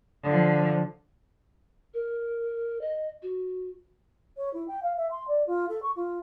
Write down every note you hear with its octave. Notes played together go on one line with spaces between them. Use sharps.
D3 F3
A#4
D#5
F#4
C#5
E4
G5
F5
E5
C6
D5
F4
A4
C#6
F4